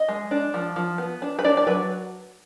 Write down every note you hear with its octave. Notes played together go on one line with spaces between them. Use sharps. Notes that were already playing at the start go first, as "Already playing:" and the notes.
Already playing: D#5
G#3
D4
F3
F3
B3
D4
B4
D4 D5
D5
F#3 B4